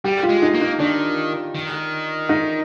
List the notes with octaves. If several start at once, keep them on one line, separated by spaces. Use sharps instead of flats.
G3 G4
F4
G#3
D#4
A#3
D#4
D#3 D4
D#3
D#4